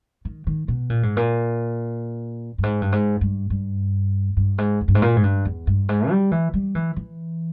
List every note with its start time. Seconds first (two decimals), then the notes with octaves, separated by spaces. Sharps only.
0.25 D#3
0.47 D#3
0.68 B2
0.90 A#2
1.03 G#2
1.17 A#2
2.58 G2
2.63 G#2
2.82 G2
2.92 G#2
3.21 G2
3.50 G2
4.37 G2
4.58 G#2
4.81 E2
4.88 G2
4.95 G#2
5.02 A#2
5.16 G#2
5.23 G2
5.45 E2
5.67 G2
5.89 G#2
6.10 G3
6.32 E3
6.53 G3
6.75 E3
6.96 E3